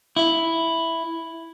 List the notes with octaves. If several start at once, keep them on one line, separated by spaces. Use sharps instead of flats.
E4